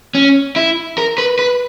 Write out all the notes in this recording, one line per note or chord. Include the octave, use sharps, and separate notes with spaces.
C#4
E4
A#4
B4
B4